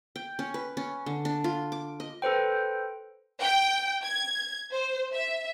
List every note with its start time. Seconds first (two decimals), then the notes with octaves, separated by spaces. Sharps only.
0.16 G5
0.39 C#4
0.54 B4
0.77 C#4
1.06 D3
1.25 D4
1.44 F4
1.72 D6
2.00 D#5
2.22 A4 B4 C5 G5
3.39 G5
4.02 G#6
4.72 C5
5.13 E5